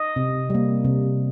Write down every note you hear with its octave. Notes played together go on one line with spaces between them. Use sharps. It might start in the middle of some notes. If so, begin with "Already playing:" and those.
Already playing: D#5
C3
G3 A#3
C3